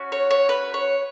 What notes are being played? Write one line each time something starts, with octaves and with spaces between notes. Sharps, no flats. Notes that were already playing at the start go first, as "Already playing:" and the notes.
Already playing: C#4 F#4
C#5
C#5
B4
C#5